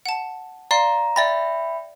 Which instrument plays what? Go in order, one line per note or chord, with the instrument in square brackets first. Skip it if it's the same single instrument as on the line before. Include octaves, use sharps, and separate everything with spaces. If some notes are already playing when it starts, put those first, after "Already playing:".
[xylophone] F#5 A5
[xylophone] D5 F5 C6 [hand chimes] A#5
[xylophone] D5 A6 A#6 [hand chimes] E5 G5 B5